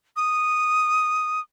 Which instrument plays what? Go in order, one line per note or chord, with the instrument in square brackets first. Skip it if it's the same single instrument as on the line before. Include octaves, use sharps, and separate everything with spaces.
[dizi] D#6